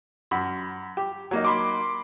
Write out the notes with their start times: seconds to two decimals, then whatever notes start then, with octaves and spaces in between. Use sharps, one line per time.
0.31 F#2 B5
0.97 G4
1.31 F#3 A#3 D#4
1.45 B5 C6 D6